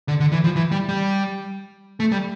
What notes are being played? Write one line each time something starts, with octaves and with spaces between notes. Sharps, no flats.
D3
D3
E3
F3
E3
G3
G3
A3
G3